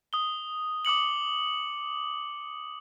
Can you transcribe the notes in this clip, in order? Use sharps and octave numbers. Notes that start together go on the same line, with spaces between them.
D#6 G7
D6 D#6 C#7 F#7